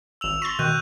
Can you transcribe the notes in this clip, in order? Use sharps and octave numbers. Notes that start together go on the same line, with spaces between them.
G#1 E6 E7 F7
C6 C#6 A6 A#6 F7
B2 D#3 F#6 G6 D#7